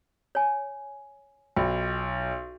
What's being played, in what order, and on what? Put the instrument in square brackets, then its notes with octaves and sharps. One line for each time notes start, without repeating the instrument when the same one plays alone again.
[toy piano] C#5 G#5
[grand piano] B1 [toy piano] F4 G5